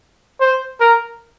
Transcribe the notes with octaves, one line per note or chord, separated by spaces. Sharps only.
C5
A#4